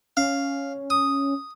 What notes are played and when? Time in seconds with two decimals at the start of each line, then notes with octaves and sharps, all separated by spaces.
0.17 C#4 F5
0.90 D#6